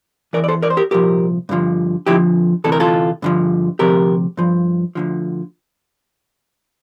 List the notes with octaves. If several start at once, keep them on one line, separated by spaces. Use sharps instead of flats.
E2 E3 A#4 D5
D5
A4 C5
A#4 D5
C5
G4 A#4
C2 A#2 F3 G4 A#4
G2 D3 F3
F2 D3 F3 E4 G4
D2 C3 E3 A4
A#4
F4 A4
G2 D3 F3
D2 C3 F3 G4 A#4
G2 F3
D2 D3 F3